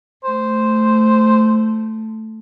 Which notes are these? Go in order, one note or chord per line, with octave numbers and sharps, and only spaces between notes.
A3 C5